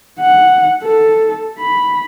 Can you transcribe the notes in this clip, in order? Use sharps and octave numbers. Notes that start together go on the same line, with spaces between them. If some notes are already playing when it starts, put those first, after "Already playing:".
F#5
A4
B5